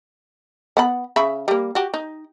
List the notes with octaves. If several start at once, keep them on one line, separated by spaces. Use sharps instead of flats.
B3 F#5 B5
C#3 E5 B5
G3 A#3
F#4 G4
D#4